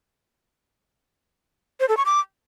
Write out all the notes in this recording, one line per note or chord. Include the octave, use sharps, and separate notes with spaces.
C5
A4
C#6
D6